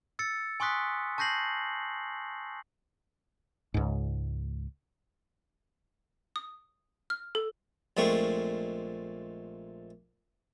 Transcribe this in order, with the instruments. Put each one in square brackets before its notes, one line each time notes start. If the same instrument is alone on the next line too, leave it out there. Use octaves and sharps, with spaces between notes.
[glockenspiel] E6 A6 C#7
G#5 C6 C#6 D#6 F#6 B6
A5 C#6 G6 A#6 C7 F#7
[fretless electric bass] C#2 G#2
[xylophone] D#6
F6
A4
[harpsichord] A#1 A#2 G#3 A3 C4 C#6